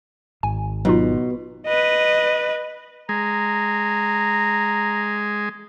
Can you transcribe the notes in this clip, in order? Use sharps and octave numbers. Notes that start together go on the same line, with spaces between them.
G#1 G#5
B2 F#3 D#4 F4
B4 D#5
G#3 A#5